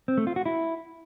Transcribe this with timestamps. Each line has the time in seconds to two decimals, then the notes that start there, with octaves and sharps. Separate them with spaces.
0.08 C4
0.18 A3
0.27 F4
0.36 F#4
0.46 E4